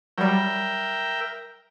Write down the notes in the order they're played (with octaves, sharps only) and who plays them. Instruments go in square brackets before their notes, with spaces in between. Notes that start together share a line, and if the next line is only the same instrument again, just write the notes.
[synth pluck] F#3 G3 [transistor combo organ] A#4 E5 G5